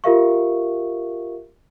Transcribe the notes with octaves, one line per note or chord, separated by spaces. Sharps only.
F4 G4 A#4 E5 F5 C#6